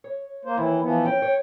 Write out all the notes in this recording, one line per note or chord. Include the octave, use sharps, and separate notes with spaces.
C#5
A#3 C5
D#2 E3 E4
E3 F3 B3
C#4 G5
C#5